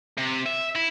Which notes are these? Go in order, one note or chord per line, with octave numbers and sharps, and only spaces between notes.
C3
E5
E4